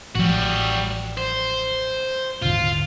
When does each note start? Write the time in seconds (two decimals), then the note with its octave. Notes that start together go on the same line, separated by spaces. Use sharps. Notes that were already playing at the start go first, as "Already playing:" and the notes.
0.15 A1 F3 G3 F#4
1.17 C5
2.42 D#1 G#1 D3 F4